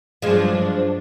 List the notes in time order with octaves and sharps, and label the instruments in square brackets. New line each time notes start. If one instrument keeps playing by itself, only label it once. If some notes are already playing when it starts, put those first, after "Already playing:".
[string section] G2 F#3 D4 [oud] F3 G#3